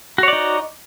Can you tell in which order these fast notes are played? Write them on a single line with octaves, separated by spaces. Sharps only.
F#4 C#5 D5 D#4